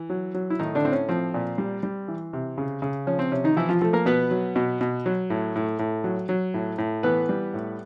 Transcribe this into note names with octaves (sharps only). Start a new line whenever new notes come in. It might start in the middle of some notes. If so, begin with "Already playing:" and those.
Already playing: E3
F#3
F#3
E4
A2 D#3 D#4
D3 D4
A2 C4
C#4
F3 C4
A#2
G3
G3
E3
C3
C#3
C#3
F3 C#4
C4
C3 C#4
D#3 D#4
E3 F3 E4
F3 F4
F3 A3 A4
A#3 A#4
B2 B3 B4
F#3
B2
B2
F#3
A2
A2
A2
F#3
F#3
A2
A2
E3 B3 B4
G3
A2